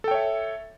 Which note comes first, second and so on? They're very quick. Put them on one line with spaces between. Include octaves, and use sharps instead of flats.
A4 G5 C#5 E5